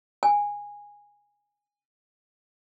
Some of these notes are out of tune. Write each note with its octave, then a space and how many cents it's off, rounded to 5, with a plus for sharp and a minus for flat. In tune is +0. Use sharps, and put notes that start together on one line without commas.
G#5 -15